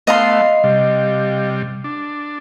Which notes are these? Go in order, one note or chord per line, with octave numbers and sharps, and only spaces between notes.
A3 B3 D#5 F5 C6
C3 G3
D4